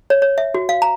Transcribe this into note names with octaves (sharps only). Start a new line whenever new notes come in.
C#5
C#5
E5
F#4
F5
A#5